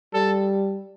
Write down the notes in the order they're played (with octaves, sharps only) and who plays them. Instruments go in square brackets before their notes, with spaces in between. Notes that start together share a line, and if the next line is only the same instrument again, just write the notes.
[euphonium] G3 [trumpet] A4